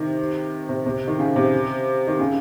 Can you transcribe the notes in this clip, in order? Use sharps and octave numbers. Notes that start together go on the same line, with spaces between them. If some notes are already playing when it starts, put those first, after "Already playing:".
Already playing: C3 D#3
C3
C3
D#3
C#3
C3
D#3
C#3